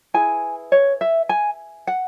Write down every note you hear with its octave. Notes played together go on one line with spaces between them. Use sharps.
E4 G#4 B4 G#5
C#5
E5
G#5
F#5